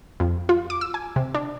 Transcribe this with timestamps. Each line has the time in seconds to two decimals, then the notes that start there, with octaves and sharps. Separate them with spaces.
0.20 F2
0.49 F4
0.70 D6
0.81 E6
0.94 G#5
1.16 C3
1.34 D4